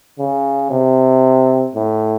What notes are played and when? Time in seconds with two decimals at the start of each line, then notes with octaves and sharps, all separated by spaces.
0.19 C#3
0.70 C3
1.75 A2